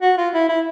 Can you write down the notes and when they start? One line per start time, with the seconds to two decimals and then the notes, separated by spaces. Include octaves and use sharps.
0.02 F#4
0.18 F4
0.34 E4
0.49 E4